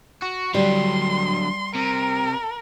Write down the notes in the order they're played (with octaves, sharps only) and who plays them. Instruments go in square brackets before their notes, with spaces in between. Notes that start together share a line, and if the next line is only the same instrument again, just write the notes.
[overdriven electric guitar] F#4
[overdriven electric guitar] D3 F#3 [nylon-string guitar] G3 [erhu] C6
[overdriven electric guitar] C3 [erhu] A#4